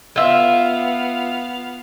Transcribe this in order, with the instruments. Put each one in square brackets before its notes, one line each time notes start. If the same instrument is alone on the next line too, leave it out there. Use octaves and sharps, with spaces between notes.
[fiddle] B3 F5 [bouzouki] F4 E5